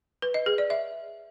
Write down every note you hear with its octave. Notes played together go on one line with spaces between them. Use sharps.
B4
D#5
G#4
D5
E5